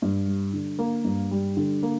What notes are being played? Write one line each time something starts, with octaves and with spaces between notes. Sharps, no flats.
G2
G3
D3
A#3
G2
G3
D3
A#3